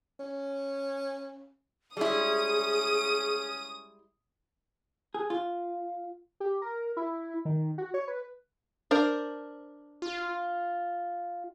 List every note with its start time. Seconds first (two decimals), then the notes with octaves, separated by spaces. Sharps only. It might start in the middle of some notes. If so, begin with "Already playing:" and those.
0.20 C#4
1.97 G3 G#3 C#4 E4 G#4 D#6 D#7
5.14 G#4
5.30 F4
6.40 G4
6.62 A#4
6.97 E4
7.45 D#3
7.78 F#4
7.94 C#5
8.08 B4
8.91 D4 A#4 C5
10.02 F4